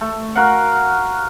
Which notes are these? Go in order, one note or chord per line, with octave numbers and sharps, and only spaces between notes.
A3
F#4 A#4 F5 F#5